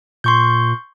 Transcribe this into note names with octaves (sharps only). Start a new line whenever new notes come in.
A#2 C6 C#6 G6